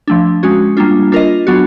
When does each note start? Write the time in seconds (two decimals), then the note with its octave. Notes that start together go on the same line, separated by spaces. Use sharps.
0.08 F3 A3 D4
0.43 G#3 C#4 F#4
0.77 G3 A#3 D4 F4
1.12 D4 F4 A#4 D#5
1.47 F#3 B3 D4 F#4